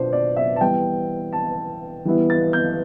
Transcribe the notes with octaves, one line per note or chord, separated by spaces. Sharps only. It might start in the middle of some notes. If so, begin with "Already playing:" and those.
Already playing: B2 D4 F4 C5
D5
E5
A5
E3 G3 B3 E4 G5
A5
E3 G3 B3 E4
A6
G6